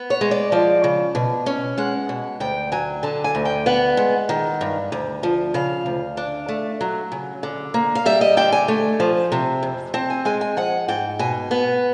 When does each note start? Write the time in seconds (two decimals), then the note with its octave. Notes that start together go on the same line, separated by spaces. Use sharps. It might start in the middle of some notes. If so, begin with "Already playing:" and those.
Already playing: B3
0.10 C#5
0.21 G#3
0.31 D5
0.52 F3 D5
0.84 C#3
1.15 B2
1.46 C#4
1.78 G#3 F#5
2.09 B2
2.40 D2 G5
2.72 F#3 G#5
3.03 D3 A5
3.24 G#5
3.35 D2
3.45 G5
3.66 B3 F#5
3.97 G#3
4.29 D#3
4.61 G2
4.92 D2
5.23 F3
5.54 C#3 F5
5.86 D2
6.17 D4
6.49 A3
6.81 F#3
7.12 C#3
7.43 D3
7.74 A#3
7.95 F5
8.06 G3 E5
8.21 D#5
8.37 D3 G5
8.52 G#5
8.68 A3
9.00 F3
9.32 C3
9.63 F2
9.94 C4 A5
10.10 G#5
10.25 G#3 G#5
10.41 G#5
10.57 F3 F#5
10.88 G#2 G5
11.19 B2 G#5
11.51 B3